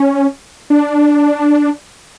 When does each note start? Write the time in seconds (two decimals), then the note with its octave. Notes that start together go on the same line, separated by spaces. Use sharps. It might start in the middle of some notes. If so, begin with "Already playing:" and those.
Already playing: C#4
0.70 D4